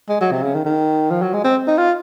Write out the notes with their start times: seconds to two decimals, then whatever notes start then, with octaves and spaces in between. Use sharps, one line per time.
0.09 G#3
0.21 F#3
0.32 C3
0.43 C#3
0.55 D#3
0.65 D#3
1.10 F3
1.22 F#3
1.34 G#3
1.44 C4
1.68 D#4
1.78 F4